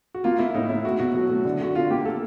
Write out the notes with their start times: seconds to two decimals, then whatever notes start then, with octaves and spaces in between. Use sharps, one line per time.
0.14 F#4
0.24 A#3 F4
0.39 A#3 E4
0.54 A2 D#4
0.69 A2 E4
0.84 A3 F#4
0.99 B2 F#4
1.14 F#3
1.30 A3
1.45 D3
1.61 D3 F#4
1.75 D3 F4
1.90 A#3 G4
2.05 A4